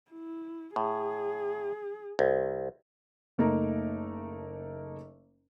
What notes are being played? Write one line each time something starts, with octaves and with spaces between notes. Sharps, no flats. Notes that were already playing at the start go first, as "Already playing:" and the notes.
E4
A2 G#4
C2
F#1 A3 A#3 D#4 A#4 A#5